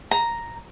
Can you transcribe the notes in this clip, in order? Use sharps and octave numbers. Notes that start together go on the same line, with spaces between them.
A#5